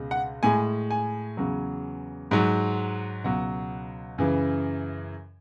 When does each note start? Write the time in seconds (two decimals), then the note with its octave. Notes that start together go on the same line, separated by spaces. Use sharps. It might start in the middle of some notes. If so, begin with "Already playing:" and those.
Already playing: C#2 B2 G#3
0.11 F#5
0.43 A2 G#3 G#5
0.91 G#5
1.37 E2 C#3 F#3
2.31 G#2 F#3
3.24 C#2 B2 F#3 F#5
4.18 F#2 C#3 E3